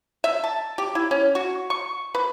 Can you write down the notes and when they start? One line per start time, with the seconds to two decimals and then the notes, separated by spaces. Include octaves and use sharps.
0.24 E5
0.44 A5
0.78 G4
0.95 E4
1.11 C#4
1.35 F#4
1.70 C#6
2.15 B4